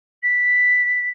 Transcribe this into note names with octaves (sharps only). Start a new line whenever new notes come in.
B6